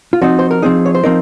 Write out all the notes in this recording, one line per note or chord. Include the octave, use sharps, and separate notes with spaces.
F4
F3 C4 D#4 F#4
C5
A#4
F3 C4 D#4 G#4
C#5
C5
F3 C4 D#4 A#4